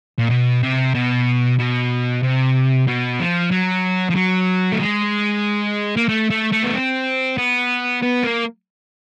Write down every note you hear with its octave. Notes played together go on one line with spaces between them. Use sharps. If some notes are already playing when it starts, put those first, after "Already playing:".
A#2
B2
C3
B2
B2
C3
B2
F3
F#3
F3
F#3
A3
G#3
A#3
A3
A3
A3
B3
C4
B3
B3
A#3